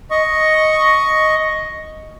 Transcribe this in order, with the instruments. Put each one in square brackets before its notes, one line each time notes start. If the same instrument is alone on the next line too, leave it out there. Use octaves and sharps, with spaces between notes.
[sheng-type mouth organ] D#5 C#6